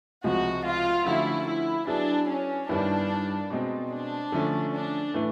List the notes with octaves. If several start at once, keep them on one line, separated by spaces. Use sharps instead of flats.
C#2 C3 F3 G#3 F#4
F4
D3 F3 A3 C#4 E4 F#4
E4
F#3 B3 D4 E4 G#4 B4
C#4
G2 D#3 G3 B3 D4 E4
B2 G#3 C4
D4
D3 F3 A3 C#4
D4
A2 E3 A3